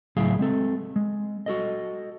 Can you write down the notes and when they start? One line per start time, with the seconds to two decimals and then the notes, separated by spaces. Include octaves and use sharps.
0.16 C#2 A2 F#3 E4 G#4 F5
0.39 G#3 C4 A4
0.96 G#3
1.46 F#4 A4 D#5